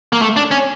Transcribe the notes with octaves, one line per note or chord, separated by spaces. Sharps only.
A#3
A3
D4
C#4